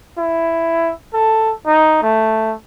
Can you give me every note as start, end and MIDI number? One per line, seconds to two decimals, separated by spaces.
0.18 0.92 64
1.13 1.52 69
1.66 2.02 63
2.03 2.54 57